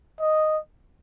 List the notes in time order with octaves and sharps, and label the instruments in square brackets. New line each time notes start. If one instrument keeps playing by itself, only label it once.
[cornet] D#5